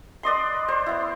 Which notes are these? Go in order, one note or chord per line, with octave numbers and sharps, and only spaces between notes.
B4 D5 D#5 C6
C5
B3 E4